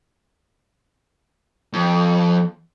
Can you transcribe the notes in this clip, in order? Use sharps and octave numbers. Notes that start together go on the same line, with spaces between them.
F2